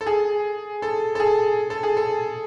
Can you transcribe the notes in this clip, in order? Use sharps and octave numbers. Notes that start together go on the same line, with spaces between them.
A4
G#4
A4
A4
G#4
A4
G#4
A4